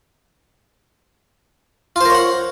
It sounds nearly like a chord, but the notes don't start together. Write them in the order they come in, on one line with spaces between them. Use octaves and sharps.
F4 C5 A#4 C#5 F#5